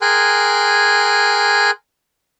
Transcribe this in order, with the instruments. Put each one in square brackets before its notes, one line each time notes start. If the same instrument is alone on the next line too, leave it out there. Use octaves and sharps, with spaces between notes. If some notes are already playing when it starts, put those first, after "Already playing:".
[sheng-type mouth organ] G#4 A#4 G5 G#5 C6 F#6